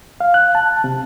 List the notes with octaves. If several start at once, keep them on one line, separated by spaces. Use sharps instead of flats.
F5
F#6
A5
C3